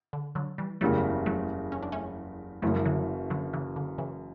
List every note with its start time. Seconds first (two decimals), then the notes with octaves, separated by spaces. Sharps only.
0.13 D3
0.35 D3 F#3
0.58 E3 G3
0.81 F#1 E2 C#3 F#3 G3 A3
1.26 F#3 A3
1.72 C#4
1.82 D4
1.92 A3 C#4
2.62 F#1 F#2 E3 F#3 A3
2.76 G3
2.85 D3 F#3
3.30 D3 F#3
3.53 C#3 E3
3.76 D3
3.98 C#3 E3